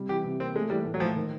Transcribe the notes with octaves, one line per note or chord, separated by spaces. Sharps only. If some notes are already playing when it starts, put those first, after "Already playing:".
Already playing: C3 G3
E3 G4
C3
A#3 C4
G#3 A3
E3 G3
A2
F#3
A2 F3
D#3